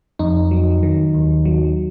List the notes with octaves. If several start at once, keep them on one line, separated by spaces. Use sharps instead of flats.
F2 D#4
F#3
D#3
D#2
F#3